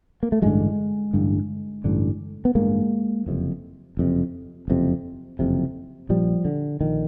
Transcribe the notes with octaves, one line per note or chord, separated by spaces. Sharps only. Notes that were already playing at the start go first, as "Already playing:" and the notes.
A#3
A3
A1 G2 D3 F#3 G#3
A1 G2 D3
A1 G2 D3
B3
A1 G2 D3 G#3 A#3
F#1 F2 C3
F#1 F2 C3
F#1 F2 C3
F#1 F2 C3
A#1 A#2 F3 G3
D3
A#1 A#2 D#3